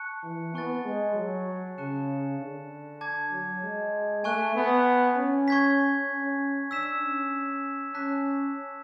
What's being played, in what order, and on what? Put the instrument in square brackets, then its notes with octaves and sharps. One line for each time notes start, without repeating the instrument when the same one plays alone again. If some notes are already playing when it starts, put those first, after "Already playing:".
Already playing: [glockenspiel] A5 C#6 F#6 C#7
[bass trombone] E3
[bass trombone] B3 [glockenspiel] G#5 C#6 F#6 A6
[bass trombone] G#3
F#3
[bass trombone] C#3 [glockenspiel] A5 C#6 F#6 C#7 E7
[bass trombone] D3
[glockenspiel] A5 D6 G#6
[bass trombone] F#3
G#3
[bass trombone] A3 [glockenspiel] G#5 C#6 F#6
[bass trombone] B3
C#4
[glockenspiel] C#6 G#6 B6
[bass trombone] C#4
[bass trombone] D4 [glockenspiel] E6 B6 E7
[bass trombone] C#4
[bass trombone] C#4 [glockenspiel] A5 D6 F#6 B6